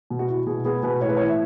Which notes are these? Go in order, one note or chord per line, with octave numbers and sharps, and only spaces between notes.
B2
F#4
E4
B2 G#4
B3 G#4
B2 B4
A2 C#5
B4
E3 C#5
E5